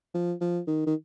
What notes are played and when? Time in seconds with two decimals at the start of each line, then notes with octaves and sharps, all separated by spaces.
0.15 F3
0.41 F3
0.67 D#3
0.87 D#3